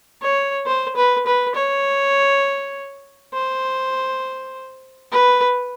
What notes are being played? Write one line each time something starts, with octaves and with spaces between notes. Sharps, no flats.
C#5
C5
B4
B4
C#5
C5
B4